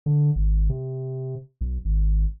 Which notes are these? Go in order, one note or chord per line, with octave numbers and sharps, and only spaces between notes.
D3
G#1
C3
B1
G#1